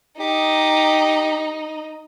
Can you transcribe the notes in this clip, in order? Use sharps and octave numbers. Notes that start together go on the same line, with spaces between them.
D#4 G4